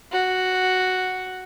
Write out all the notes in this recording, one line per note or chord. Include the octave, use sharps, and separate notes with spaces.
F#4